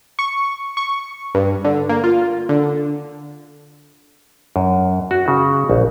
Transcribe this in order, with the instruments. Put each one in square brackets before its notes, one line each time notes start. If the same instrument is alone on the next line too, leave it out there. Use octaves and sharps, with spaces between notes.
[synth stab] C#6
C#6
G2
D3
A#3
F4
D3
[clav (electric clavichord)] F#2
F#4
C#3
A#1